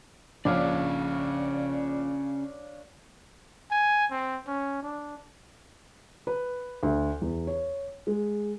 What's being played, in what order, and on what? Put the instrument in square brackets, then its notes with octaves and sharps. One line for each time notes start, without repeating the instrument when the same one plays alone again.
[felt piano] A#1 [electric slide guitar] C#4 G#4 D5 [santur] D4 C#5 F5
[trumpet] G#5
C4
C#4
D4
[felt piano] B4
D2
E2
C#5
G#3